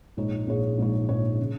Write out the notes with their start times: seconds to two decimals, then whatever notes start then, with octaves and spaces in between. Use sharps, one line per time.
0.17 A#1 G#2 G#3 D#4 C#5
0.47 A#1 G#2 G#3 D#4 C#5
0.78 A#1 G#2 G#3 D#4 C#5
1.09 A#1 G#2 G#3 D#4 C#5
1.39 C#3